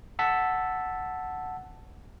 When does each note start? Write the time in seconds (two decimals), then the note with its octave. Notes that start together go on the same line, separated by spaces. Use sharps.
0.19 F#5 A5 E6 B6